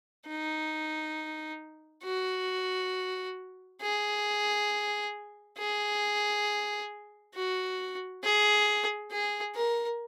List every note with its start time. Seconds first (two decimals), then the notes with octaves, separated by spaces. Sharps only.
0.28 D#4
2.04 F#4
3.81 G#4
5.58 G#4
7.34 F#4
8.23 G#4
9.11 G#4
9.56 A#4